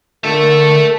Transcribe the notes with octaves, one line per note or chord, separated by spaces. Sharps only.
D3 A4 A#4 E5